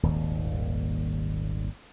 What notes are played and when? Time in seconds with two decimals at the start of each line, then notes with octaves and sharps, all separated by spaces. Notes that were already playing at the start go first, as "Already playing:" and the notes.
0.03 D#1 G#1 D#2